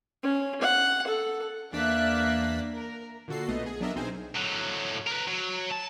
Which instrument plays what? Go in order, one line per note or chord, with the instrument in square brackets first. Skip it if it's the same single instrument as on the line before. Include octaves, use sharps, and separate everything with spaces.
[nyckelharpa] C#4
F#5
A4
[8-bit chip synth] E2 D4 B6 [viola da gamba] A#3 [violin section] D5 E5 F#6
[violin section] A#4
[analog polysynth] A#2 D3 F#4 A4 C7
B1 A#2 A3 B3 D#5
G#4
F#3 B3 D4 A#4 D#5 E5
B1 C4 D#4 G#4 C5 G#5
[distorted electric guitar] A2 F#3
A#4 B4
F#3
A5